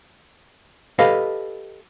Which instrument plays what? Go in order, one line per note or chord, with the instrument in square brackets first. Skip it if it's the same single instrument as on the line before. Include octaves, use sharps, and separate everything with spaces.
[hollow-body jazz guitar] G4 A4 B4 D#5 F5